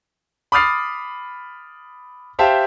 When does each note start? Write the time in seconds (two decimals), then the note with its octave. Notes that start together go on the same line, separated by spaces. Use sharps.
0.52 B5 D6 D#6 F6 A6 C7
2.39 G4 C5 E5 F5 G5 A5